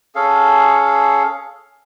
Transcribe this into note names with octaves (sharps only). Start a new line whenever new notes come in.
C#4 G#4 A4 F5